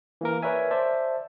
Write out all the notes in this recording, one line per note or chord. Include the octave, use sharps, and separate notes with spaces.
E3 A#3 A#4
A#4 B4 C#5 D5 E5 G#5
C5 D5 E5 A5